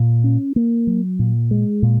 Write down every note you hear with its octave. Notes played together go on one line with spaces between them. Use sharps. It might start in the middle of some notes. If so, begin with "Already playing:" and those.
Already playing: A#2
C#4
A#3
F#3
A#2
G#3
A#2